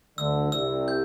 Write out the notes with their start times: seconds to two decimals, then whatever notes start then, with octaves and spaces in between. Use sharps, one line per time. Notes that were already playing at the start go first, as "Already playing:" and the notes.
0.18 D2 D3 E6
0.52 C2 C3 E6
0.88 G6